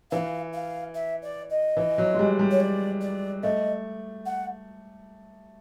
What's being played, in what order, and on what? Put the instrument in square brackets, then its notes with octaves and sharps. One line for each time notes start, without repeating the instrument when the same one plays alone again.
[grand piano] E3 [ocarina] F5
[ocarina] F5
E5
D5
D#5
[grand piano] E3
F#3
G#3
G3
G3
[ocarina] C#5
D5
D5
[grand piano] A3 [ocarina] D#5
[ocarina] F#5